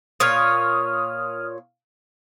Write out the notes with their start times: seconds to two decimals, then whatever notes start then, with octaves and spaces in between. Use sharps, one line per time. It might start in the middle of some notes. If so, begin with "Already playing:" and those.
0.20 A#2 C#5 D#6 F6